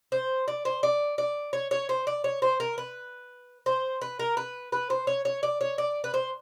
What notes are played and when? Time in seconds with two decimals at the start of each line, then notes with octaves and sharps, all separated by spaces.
0.12 C5
0.48 D5
0.65 C5
0.83 D5
1.18 D5
1.53 C#5
1.71 C#5
1.89 C5
2.07 D5
2.24 C#5
2.42 C5
2.60 A#4
2.78 B4
3.66 C5
4.02 B4
4.19 A#4
4.37 B4
4.72 B4
4.90 C5
5.07 C#5
5.25 C#5
5.43 D5
5.61 C#5
5.78 D5
6.04 B4
6.14 C5